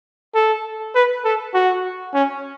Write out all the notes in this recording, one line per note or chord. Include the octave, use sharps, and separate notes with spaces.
A4
B4
A4
F#4
C#4